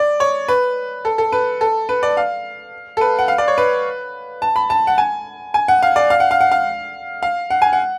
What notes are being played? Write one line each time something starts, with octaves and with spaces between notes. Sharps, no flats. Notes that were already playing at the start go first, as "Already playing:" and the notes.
Already playing: D5
C#5
B4
A4
A4
B4
A4
B4
D5
F5
A4
B4
F#5
F5
D5
C#5
B4
A5
B5
A5
F#5
G#5
G#5
F#5
F5
D5
F5
F#5
F5
F#5
F5
F5
F#5
G#5
F#5